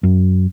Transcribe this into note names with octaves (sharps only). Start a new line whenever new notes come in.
F#2